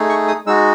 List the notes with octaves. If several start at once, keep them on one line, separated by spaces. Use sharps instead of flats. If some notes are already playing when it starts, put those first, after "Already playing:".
Already playing: A3 D#4 G#4
C#6
D#6
G#3 D#4 F#4 E6